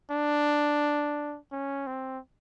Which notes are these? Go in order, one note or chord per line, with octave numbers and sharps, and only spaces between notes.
D4
C#4
C4